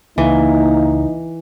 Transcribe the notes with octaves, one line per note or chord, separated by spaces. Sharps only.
C#2 E3 A#3 D#4